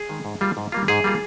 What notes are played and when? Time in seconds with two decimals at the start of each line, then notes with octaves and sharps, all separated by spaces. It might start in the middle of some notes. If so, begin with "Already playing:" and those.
Already playing: G#4
0.09 D#3 G#3
0.25 G#2
0.41 G3 A#3 F4
0.57 G#2
0.72 G3 A#3 F4
0.88 G#2 G#4
1.04 G3 A#3 F4